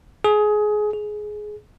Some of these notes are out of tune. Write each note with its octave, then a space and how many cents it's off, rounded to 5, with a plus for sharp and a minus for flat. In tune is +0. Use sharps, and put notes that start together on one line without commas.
G#4 +20
G#4 +15